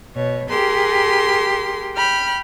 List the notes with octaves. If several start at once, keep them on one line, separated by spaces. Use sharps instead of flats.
B2 C#5
G4 G#4 A#4 C6
G5 B5 F6